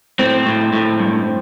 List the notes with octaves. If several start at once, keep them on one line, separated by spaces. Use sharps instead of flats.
A2 C4
A2
A2
G2